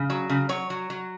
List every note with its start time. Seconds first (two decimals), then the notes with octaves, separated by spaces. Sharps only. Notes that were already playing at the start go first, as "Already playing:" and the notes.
Already playing: C#3
0.10 F#3
0.30 C#3
0.49 F#3 C#5
0.70 F#3
0.90 F#3